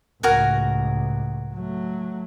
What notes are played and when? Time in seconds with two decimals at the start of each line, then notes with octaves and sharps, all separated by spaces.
0.23 C#2 A2 F#4 A#4 G#5
1.55 F#3 A3